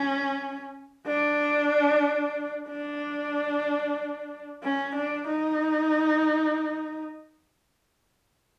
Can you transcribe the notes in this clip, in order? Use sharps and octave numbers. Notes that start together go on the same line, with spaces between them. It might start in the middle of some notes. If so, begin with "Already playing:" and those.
Already playing: C#4
D4
D4
C#4
D4
D#4